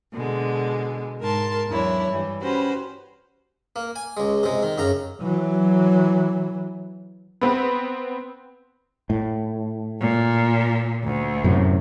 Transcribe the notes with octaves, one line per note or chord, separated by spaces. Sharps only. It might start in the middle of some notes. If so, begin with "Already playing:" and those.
B2 D3 G#3
G#2 A#4 A5 C6
E2 F#3 D4 E4 C#5
G2 E3 G3
C#4 F#4 G4 B4 C5 B5
A#3
G#5
C#2 G#3
C3 G#3
D#3
F#2 C#3 A#5
E3 F#3
B3 C4 B4
A2
A#2
D2
F#2 A2 C3